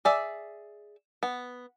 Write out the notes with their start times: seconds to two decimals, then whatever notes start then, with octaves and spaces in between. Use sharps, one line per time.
0.05 G#4 D5 E5
1.23 B3